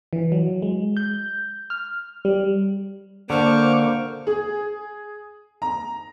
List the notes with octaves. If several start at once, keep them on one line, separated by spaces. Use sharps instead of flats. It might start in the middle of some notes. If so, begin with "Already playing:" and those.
E3
F#3
G#3
G6
F6
G3
D3 A#3 C5 C#6 D6 F6
G#4
A#5